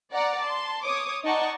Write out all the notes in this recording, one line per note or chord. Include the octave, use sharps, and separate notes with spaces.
D5 F#5 A#5
A5 C6
C#5 D6 D#6
D#4 D5 D#5 F#5 A5 C#6